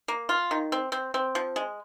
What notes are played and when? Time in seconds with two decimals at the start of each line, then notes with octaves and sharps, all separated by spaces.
0.08 A#3
0.29 F4
0.51 D#3
0.72 C4
0.92 C4
1.14 C4
1.35 F3
1.56 G#3